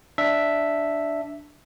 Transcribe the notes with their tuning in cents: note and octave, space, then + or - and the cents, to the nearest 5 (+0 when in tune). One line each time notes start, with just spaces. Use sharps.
D4 +0 E5 +0